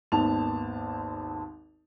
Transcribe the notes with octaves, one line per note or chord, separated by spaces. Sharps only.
G#1 D#2 B3 A5 F7